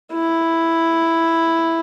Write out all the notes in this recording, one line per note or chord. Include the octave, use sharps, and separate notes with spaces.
E4